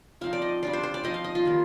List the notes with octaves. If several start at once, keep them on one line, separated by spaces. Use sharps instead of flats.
F3 C4 D#4 F5
D5
D#5
G3 D4 F4 D5
C5
C5
D5
F3 C4 D#4 D#5
F5
D#5
F4
D#3 G3 A#3